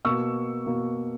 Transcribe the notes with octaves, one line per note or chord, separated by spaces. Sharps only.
B2 A#3 C#6 E6
B2 A#3